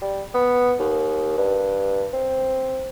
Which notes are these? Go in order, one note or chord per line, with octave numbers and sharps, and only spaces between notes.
G3
B3
D#2
G2
C4